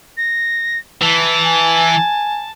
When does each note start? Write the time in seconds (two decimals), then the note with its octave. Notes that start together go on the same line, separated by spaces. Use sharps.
0.17 A#6
1.02 E3 A5
1.44 G#5